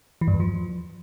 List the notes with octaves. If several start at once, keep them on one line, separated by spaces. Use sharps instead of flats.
E3
G2
E2
F3